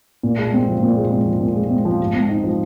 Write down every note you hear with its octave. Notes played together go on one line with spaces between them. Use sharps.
A#2
G#3
C4
F3
A#2
G#3
C4
F3
A#2
G#3
C4
F3
G#2
C4
D#4
F3